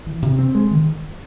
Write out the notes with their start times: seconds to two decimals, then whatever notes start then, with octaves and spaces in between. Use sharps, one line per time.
0.06 E3
0.22 C3
0.39 C4
0.55 G#3
0.71 D#3